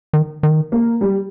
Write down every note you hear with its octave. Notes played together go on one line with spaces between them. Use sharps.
D#3
D#3
A#3
G3